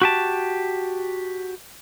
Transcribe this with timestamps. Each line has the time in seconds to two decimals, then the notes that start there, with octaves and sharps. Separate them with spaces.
0.02 F#4 G4 A5